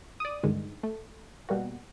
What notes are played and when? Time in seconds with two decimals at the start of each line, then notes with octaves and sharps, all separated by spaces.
0.20 D5 D#6
0.43 C#2 G2 D3 D#3 G#3
0.83 A3
1.49 B2 G3 A#3 F#4